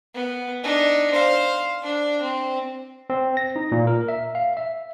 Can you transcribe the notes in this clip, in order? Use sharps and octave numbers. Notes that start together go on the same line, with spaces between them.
B3
D4 D#4
C5 F5
D4
C4
C4
A#6
D#4
A#2
A#4
E5
F5
E5